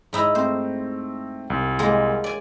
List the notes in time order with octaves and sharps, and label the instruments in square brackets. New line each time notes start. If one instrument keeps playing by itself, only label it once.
[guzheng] G#2 D#4 E4
[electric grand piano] A3 C4 [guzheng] C5
[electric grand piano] C2
[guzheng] G#3 A#3
D5 G#5